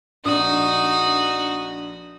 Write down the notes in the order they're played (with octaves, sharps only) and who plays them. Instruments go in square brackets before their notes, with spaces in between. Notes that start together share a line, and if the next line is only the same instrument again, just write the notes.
[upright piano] A#1 D4 [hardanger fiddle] D#4 F#4 [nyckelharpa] D#6